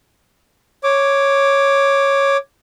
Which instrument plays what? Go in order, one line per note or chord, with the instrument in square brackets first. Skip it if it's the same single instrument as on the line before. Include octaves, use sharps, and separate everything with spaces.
[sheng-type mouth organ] C#5 D6